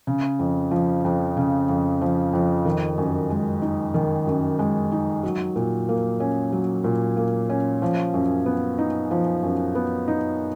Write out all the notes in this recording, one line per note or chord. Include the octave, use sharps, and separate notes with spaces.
C#3
F2
F3
F2
C#3
F2
F3
F2
D#3
F#2
G#3
D#4
D#3
F#2
G#3
D#4
F#3
A#2
A#3
C#4
F#3
A#2
A#3
C#4
F3
F#2
B3
D#4
F3
F#2
B3
D#4